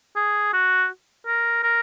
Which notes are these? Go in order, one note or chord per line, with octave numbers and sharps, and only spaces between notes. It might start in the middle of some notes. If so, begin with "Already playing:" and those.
G#4
F#4
A#4
A#4